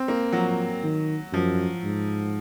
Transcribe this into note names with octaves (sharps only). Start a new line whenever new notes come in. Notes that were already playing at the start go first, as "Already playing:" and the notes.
Already playing: C4
A#3
F3 F#3
D#3
F#2 F3
G#2